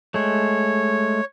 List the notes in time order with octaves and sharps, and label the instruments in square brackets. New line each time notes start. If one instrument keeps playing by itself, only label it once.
[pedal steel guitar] G#3 A3 [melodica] C#5